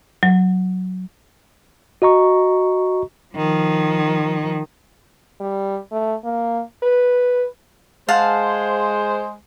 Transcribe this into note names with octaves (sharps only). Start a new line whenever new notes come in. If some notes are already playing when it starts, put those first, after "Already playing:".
F#3
F#4 D#5 A#5 C#6
D#3 F3
G3
A3
A#3
B4
G#3 C5 F5 F#5 A5